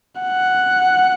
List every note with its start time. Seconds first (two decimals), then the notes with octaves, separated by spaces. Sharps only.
0.21 F#5